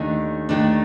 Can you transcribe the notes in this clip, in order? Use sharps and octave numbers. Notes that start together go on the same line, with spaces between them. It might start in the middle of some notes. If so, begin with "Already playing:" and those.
Already playing: D#2 D#3 A3 D4
D#2 D#3 A3 D4